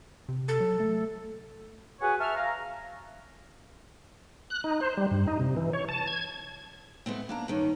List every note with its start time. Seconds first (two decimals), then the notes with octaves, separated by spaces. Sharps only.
0.28 C3
0.48 A4
0.60 F#3
0.80 A3
2.01 F#4 G#4 B4 C#5 F#5 G#5
2.20 E5 A5 C#6 F6
2.36 F5 A#5
4.50 F#6
4.64 D#4
4.81 C5
4.97 G3
5.11 G2
5.27 D#4
5.40 C3
5.56 E3
5.73 C#5
5.89 A5
6.07 G#6
7.06 G#3 A3 B3 C4
7.29 A#3 D4 A#5
7.48 G2 D#3 C#4